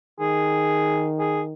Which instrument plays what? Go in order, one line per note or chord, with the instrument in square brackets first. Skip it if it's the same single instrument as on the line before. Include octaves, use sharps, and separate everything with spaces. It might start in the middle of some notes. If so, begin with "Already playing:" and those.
[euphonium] D#3 [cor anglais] G#4
[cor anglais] G#4